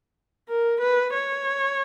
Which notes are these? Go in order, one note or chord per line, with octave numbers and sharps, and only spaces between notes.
A#4
B4
C#5